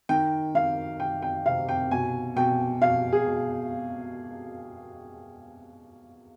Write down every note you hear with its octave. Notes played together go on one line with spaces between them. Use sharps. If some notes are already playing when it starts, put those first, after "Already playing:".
D#3 G5
D#3 F5
D#3 G5
G5
C3 F5
G5
B2 G#5
B2 G5
B2 F5
G#4
B2